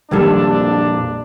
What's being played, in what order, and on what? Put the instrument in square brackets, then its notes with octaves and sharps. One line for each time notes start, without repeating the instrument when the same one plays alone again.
[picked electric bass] A#1 F2 A#2 [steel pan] D#3 G3 A4 [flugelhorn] D4